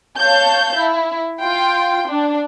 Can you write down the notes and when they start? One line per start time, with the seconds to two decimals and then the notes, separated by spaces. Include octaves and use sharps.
0.18 C#5 F5 A5 G6
0.77 E4
1.41 F4 G5 C6
2.11 D4